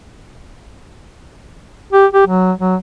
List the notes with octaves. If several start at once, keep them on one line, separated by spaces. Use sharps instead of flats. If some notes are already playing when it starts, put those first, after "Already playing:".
G4
G4
F#3
F#3